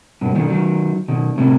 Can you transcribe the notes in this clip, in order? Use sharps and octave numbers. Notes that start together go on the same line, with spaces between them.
G2 B2
B2 D#3
D#3 F#3
B2 D#3
A2 C3